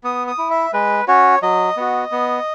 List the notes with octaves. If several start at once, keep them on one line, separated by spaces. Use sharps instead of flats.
B3 D#6
D#6
E4
E5
G#3 B4
C#4 F#4 C#5
F#3 D#5
B3 F#4
B3